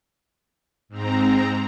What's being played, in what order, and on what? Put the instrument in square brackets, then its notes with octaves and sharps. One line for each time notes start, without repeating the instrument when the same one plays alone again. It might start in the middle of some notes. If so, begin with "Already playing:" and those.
[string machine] G#2 C4 A#5